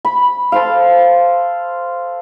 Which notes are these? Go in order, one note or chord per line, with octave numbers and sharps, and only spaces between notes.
B5
A4 C5 F5